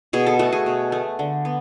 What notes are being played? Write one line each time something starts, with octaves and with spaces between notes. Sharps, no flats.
B2 G#4
A4
A3 F#4
G#4
B2
A3
D3
B3